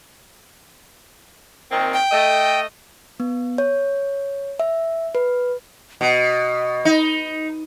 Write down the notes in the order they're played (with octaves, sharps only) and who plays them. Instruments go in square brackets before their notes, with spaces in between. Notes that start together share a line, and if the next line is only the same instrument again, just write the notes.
[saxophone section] A#2 D#3 C4
[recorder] G5
[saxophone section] A3 D#5
[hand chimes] B3
C#5
E5
B4
[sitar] B2 [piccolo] D#5
[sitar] D#4